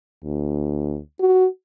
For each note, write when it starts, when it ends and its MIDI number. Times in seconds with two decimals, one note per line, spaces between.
0.23 1.00 38
1.20 1.47 66